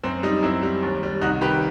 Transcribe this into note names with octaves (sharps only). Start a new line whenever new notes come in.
F#2 C4
G3 D#4
F#2 C4 E4
G3
D#2
G3
C2 D#4 F#4
D#3 G4 B4